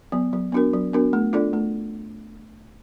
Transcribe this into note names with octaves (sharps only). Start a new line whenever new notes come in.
F#3 B3
F#3
B3 D4 F#4 A#4
F#3
B3 D4 F#4 A#4
A3
D4 F4 A4 D5
A3